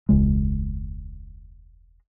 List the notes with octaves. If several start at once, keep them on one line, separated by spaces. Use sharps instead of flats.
E1 C#2 C#3 G#3